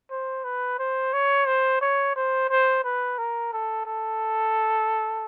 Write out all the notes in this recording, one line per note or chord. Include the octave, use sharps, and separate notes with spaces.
C5
B4
C5
C#5
C5
C#5
C5
C5
B4
A#4
A4
A4